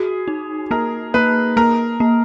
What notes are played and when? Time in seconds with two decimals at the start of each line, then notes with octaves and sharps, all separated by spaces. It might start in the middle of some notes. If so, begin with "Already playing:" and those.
Already playing: F#4 G#4
0.28 D#4
0.71 A#3 A#4
1.14 A#3 B4
1.57 A#3 A#4
2.00 A#3